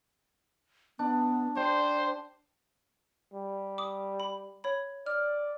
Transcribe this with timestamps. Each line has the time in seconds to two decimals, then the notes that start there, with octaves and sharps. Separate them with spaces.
0.99 B3 D4
1.56 G4 C5 D5
3.34 G3
3.78 D6 D#6
4.20 B5
4.64 C#5 B5
5.06 D5 F6